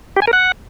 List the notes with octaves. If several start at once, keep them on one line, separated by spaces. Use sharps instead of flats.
G4
G#5
A#4
F#5